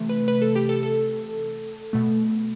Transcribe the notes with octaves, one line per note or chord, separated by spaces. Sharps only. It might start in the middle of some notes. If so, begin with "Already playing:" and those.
Already playing: C3 E3 A3
B4
B4
A4
G4
A4
A4
B2 A3